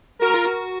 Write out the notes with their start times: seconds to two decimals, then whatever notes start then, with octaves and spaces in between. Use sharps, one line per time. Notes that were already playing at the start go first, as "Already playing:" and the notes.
0.22 F#4 A#4
0.34 F4
0.46 F#4